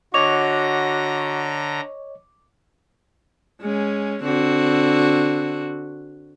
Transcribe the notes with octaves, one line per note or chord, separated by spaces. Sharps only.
D3 F#4 C#5 D#5 A#5 C#6 D6 F7
G#3 C#4
D3 C4 F#4